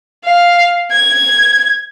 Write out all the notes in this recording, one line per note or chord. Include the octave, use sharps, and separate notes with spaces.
F5
G#6